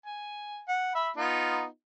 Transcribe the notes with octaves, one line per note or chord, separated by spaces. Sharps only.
G#5
F#5
E5 B5
B3 D#4 F4